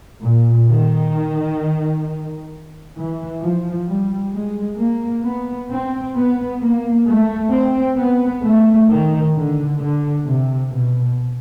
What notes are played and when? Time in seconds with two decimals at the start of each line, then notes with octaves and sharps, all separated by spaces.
0.21 A#2
0.68 D#3
2.95 E3
3.40 F3
3.87 G3
4.32 G#3
4.77 A#3
5.24 B3
5.69 C4
6.15 B3
6.61 A#3
7.06 A3
7.51 C4
7.97 B3
8.43 A3
8.89 D#3
9.34 D3
9.80 D3
10.25 C3
10.71 B2